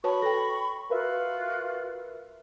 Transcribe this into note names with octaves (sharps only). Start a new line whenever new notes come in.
F#4 B4 C#5 A5 B5 C#6
A4 G5 A#6
F4 F#4 A#4 B4 E5 F5